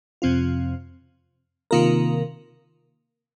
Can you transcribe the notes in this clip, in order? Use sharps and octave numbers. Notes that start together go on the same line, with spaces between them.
F2 C3 F3 C4 F4
C3 D#3 A#3 F4 A#4